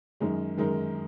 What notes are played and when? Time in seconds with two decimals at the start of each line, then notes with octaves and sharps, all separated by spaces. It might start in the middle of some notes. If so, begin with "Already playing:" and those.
0.20 F#2 D#3 G#3 D#4 A#4
0.58 F#2 D#3 G#3 D#4 A#4